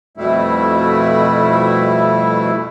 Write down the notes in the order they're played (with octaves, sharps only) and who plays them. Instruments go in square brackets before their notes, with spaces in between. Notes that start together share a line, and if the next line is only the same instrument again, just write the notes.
[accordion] F2 B2 G3 A3 E4